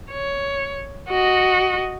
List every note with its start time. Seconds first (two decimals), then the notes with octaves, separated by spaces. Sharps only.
0.11 C#5
1.09 F#4 D#5